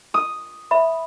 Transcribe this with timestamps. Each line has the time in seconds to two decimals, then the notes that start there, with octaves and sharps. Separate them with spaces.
0.14 D#6
0.71 E5 B5